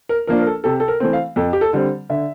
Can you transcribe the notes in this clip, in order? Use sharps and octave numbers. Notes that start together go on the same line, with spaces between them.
A#4
F3 A#3 D4 A#4
A#4
A4
C3 A4
A4
A#4
E3 A3 C4
F5
F2 A4
G4
A4
D3 G3 C4
D3 E5